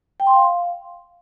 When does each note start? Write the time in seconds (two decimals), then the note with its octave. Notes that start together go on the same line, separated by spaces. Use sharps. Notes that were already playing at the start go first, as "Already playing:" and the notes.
0.20 G5
0.27 C6
0.34 F5